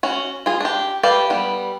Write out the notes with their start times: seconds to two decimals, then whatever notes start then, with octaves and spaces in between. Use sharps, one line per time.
0.03 C#4 F#4
0.46 F4 G#4
0.61 D4 G4
1.03 G4 A4 B4 D5 F5
1.30 G3 B3